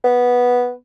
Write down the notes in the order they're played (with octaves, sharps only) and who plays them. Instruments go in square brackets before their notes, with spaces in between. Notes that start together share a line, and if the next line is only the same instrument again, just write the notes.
[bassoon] B3